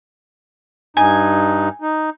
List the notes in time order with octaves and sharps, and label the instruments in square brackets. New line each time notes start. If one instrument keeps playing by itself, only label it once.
[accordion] G2 D#4 [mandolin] G#5
[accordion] D#4